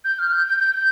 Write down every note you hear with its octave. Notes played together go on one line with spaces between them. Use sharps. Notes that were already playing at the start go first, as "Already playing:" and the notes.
G6
F6
G6
G6
G6
G6